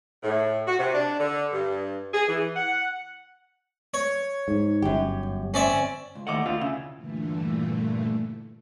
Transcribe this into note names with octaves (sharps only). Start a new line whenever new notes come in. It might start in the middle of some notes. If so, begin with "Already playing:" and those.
A2
F#4
C3
D4
D3
G2
G#4
E3
F#5
C#5
G#2
G1 F#2 G4
C4 C#4 D5 E5
C#2
D#2 A2 A3 D#5 F#5 D6
D2 F4
C#3 E4
G2 A#2 D3 E3 A3